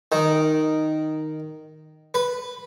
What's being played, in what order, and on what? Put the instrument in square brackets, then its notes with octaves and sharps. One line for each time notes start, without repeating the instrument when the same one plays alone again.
[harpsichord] D#3
B4